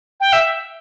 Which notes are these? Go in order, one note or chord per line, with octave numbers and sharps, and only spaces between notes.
G5
E5